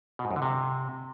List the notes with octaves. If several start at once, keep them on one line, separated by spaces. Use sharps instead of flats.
B2
G#2
F#2
D3
C3